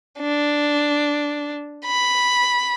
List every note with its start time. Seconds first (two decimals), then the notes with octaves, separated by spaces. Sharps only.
0.20 D4
1.86 B5